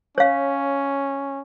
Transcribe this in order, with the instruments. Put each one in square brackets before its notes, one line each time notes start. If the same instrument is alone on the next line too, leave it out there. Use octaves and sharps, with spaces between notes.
[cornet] C#4 [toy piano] C#5 F5